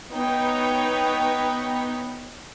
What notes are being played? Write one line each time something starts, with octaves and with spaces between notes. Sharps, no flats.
B3 D#4 B4 C#5 G5